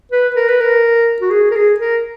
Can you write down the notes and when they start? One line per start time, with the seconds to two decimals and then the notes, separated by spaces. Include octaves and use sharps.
0.12 B4
0.36 A#4
0.48 B4
0.61 A#4
1.21 F#4
1.31 G#4
1.51 A#4
1.56 G#4
1.80 A#4